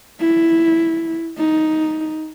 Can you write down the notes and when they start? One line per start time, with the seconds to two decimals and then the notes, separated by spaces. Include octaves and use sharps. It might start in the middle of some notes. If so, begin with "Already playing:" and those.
0.20 E4
1.38 D#4